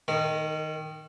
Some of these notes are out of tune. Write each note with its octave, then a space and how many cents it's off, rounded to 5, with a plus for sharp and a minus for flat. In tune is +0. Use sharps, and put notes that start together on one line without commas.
D#3 +0 A#4 -40